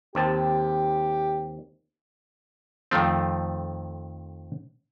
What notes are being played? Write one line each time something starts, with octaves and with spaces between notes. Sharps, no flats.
D#2 C4 G4 A5
F2 D#3 F3 A3 C4